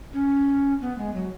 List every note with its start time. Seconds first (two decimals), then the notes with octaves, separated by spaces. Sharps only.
0.13 C#4
0.81 B3
0.98 G#3
1.14 F#3